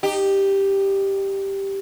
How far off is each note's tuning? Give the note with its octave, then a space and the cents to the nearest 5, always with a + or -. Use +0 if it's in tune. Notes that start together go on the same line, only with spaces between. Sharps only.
D#4 -25 G4 +0